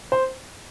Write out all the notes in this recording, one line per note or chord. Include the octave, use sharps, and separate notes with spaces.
C5